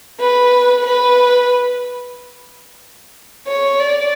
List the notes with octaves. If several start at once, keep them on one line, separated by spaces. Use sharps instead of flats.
B4
B4
C#5
D5